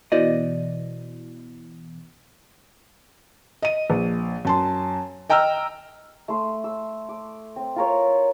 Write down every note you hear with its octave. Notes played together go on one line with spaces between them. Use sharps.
B2 E3 C5 D5 D#5
D#5 D#7
A#1
F#2 A5 C6
D#5 G5 A#5 E6 F6
A3 C6
E6
D6
C4
F4 A#4 C#5